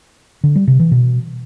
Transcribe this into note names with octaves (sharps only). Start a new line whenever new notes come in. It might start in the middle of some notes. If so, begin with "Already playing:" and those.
D3
G3
C3
E3
B2